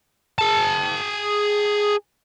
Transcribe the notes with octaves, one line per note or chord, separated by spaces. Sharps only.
G#4 A5